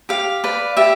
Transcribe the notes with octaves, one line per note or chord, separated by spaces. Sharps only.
G4 F5
B4 D5
G4 E5